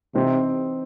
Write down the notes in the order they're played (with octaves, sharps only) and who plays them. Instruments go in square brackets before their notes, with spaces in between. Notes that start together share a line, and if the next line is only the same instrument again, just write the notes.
[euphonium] C3 [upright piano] E3 C4 D#4